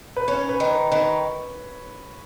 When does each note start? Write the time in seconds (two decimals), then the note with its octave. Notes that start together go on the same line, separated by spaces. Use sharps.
0.16 B4
0.28 C#4 C#5
0.49 B4
0.60 D#3
0.70 B4
0.91 D#3 B4